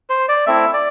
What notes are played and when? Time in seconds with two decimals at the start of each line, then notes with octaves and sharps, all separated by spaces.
0.10 C5
0.29 D5
0.47 A3 C4 E4 E5
0.74 D5